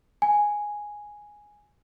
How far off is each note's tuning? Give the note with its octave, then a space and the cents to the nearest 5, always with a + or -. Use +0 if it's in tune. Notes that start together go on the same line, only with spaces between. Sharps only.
G#5 +0